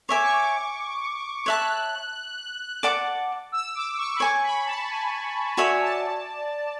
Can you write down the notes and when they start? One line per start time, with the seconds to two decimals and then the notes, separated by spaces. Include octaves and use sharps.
0.08 C#5 E5 G#5 D6
0.21 C#6
0.33 D6
1.46 C#5 E5 A5 F#6
2.83 D5 F#5 A5 D6
3.52 E6
3.75 D6
3.97 C#6
4.16 B5
4.20 C#5 G#5 C#6 D6
4.43 B5
4.66 A5
4.89 G#5
5.57 F#4 C#5 D5 E5 G#5
5.81 A5